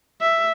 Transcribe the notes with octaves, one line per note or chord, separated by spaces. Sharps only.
E5